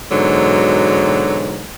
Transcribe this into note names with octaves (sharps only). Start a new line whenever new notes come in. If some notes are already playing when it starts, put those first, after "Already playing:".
G#2 B2 D3 E3 F#3